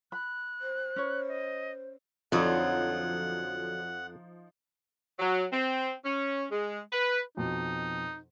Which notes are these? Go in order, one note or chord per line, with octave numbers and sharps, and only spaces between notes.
B5 F#6
C5
C#4 B4 C#5
D#5
F2 D3 F3 F#3 D#4 F#5
F#3
C4
C#4
G#3
B4
F2 B2 D#4